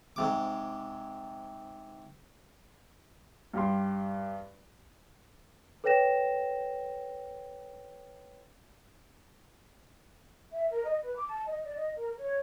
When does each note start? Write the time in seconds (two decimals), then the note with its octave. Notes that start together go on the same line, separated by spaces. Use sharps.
0.16 G#2 C3 D6
3.54 G2 G4 C6
5.84 A4 B4 C#5 G5 A#6 E7
10.52 E5
10.70 A#4
10.84 D#5
11.02 B4
11.16 D6
11.28 A5
11.47 D#5
11.64 D5
11.76 D#5
11.96 A#4
12.17 C#5